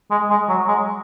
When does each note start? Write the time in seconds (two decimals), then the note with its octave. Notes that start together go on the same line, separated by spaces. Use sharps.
0.11 G#3
0.30 G#3
0.49 F#3
0.68 G#3